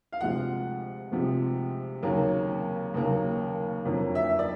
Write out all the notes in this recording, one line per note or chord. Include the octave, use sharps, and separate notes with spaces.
F5
D2 C3 F3 G#3 F#5
D2 C3 F3 G#3
D#2 C#3 F#3 A#3
D#2 C#3 F#3 A#3
F2 D3 F#3 A#3
E5
D5